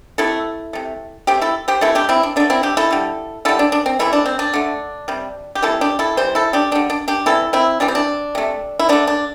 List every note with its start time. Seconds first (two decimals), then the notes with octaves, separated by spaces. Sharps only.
0.18 C3 A3 E4 A4
0.73 C3 A3
1.27 C3 A3 G4 C5
1.42 E4 A4
1.68 G4 C5
1.81 C3 E3 A3 E4 A4
1.95 D4 G4
2.09 C4 E4
2.23 D4
2.36 D3 A3 D4
2.50 C4 E4
2.63 D4 G4
2.77 E4 A4
2.91 D3 G3
3.45 D3 G3 E4 A4
3.59 D4
3.72 D4
3.86 C4
3.99 C3 E3 A3 E4
4.13 D4
4.26 C4
4.39 D4
4.54 D3 A3
5.08 C3 G3
5.55 G4
5.62 C3 E3 G3 E4 A4
5.81 D4 G4
5.99 E4 A4
6.17 C3 E3 G3 C5
6.35 E4 A4
6.53 D4 G4
6.72 D3 G3 D4
6.90 D4
7.08 D4 G4
7.26 C3 E3 G3 E4 A4
7.53 C4 E4
7.80 C3 E3 G3 D4
7.88 C4
7.95 D4
8.35 C3 A3
8.79 E4
8.89 D3 A3 D4
9.07 D4